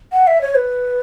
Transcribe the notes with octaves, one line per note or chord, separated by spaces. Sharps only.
F#5
E5
C#5
B4